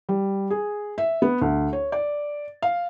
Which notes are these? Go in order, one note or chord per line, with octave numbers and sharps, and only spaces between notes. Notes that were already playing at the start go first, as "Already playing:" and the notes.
G3
G#4
E5
B3
D2
C#5
D5
F5